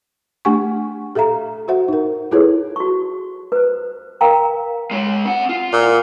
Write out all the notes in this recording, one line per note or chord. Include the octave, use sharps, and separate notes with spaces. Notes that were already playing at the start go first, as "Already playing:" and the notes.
A3 D4 G4 F#5 G#5 C#6
G4 A4 E5 F5 A#5
F#4 C5 E5 F#5
D#4 A#4
E4 F4 G#4 A4 B4 C#5
F#4 C#6
B4 C5
A#4 F5 G5 A#5
G#3 C#5
C#4 F#5
F4
A#2